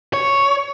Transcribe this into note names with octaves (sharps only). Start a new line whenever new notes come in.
C#5